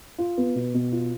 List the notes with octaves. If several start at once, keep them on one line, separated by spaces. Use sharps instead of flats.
F4
B3
B2
B2
F4